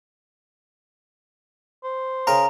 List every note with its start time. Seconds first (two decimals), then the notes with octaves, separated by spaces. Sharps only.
1.84 C5
2.27 C#3 G#4 A#4 A#5